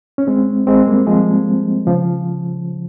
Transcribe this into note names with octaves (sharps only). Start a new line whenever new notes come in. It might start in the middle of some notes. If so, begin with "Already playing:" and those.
C#4
G#3 C4
G#3 C4
G3 A#3
F3 G#3
C#3 F3